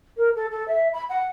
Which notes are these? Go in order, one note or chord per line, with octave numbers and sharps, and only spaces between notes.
A#4
A4
A4
E5
B5
F#5